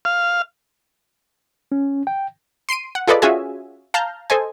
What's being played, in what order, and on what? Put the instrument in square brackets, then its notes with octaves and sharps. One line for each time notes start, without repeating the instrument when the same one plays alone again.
[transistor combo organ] F5
[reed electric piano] C#4
G5
[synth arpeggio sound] C6 C7 D7 D#7
F#5
F4 G#4 A4 B4 D5 D#5
C#4 F4 F#4 G#4 E5 G#5
F5 A5 A#5 F6 G6
A4 C5 D#5 G#5